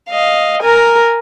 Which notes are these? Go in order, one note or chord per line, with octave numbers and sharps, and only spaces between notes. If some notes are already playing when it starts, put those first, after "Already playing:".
D#5 F5
A#4 G#5 A#5